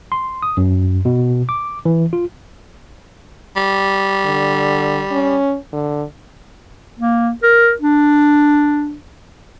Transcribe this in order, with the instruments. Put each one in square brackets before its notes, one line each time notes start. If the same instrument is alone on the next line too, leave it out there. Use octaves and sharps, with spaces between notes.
[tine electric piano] C6
D#6
F#2
B2
D6
E3
F4
[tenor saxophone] G3
[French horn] D3
C#4
D3
[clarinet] A#3
A#4
D4